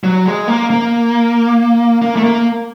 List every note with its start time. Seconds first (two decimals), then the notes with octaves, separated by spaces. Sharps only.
0.04 F#3
0.26 G#3
0.48 A#3
0.70 A#3
2.02 A#3
2.16 A3
2.24 A#3